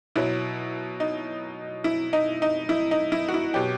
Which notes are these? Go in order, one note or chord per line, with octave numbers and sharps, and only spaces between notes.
B2 F#3 E4
D#4
E4
D#4
D#4
E4
D#4
E4
F#4
E4
B2 F#3 G4